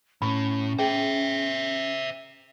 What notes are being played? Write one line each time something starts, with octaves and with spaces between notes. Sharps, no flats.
A2 C#4 B5 C#6
G#4 C5 E5 G5